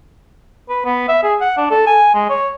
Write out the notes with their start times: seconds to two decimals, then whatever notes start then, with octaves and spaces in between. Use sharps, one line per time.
0.69 B4
0.85 B3
1.08 E5
1.23 G#4
1.41 F#5
1.57 D4
1.71 A4
1.87 G#5
2.14 G#3
2.29 C#5